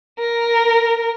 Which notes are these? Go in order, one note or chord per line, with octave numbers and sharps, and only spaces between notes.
A#4